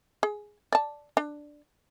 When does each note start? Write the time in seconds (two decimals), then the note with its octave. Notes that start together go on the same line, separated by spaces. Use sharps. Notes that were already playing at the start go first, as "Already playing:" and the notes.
0.23 G#4
0.72 D5 A5
1.17 D4